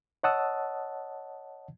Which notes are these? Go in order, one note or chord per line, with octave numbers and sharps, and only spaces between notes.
C#5 D#5 F#5 A5 D#6 E6